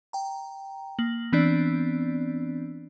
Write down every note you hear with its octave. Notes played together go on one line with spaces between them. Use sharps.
G5 A#5
A#3 F#7
E3 B3 C4 D4 D5